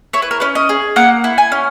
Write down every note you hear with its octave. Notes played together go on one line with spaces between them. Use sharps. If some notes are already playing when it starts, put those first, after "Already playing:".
E4 C#5
B4
A#4
C#4 B4
D#5
G#4
A#3 F#5
E4
G#5
C#4